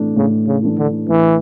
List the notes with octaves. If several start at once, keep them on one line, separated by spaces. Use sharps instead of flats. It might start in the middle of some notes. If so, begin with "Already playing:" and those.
Already playing: A2 E3 A3 D4
A2 C#3
C#3
E3 A3 D4
D3
A2 E3